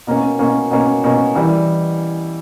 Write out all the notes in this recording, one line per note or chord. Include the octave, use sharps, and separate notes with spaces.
B2 A#3 C#4
B2 A#3 C#4
B2 A#3 C#4
B2 A#3 C#4
E3 G3